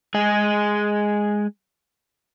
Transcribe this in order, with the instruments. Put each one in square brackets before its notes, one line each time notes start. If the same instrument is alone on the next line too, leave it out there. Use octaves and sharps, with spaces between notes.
[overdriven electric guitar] G#3 G#4